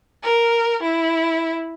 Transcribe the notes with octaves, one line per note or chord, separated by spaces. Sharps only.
A#4
E4